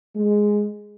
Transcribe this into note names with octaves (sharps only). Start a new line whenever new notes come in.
G#3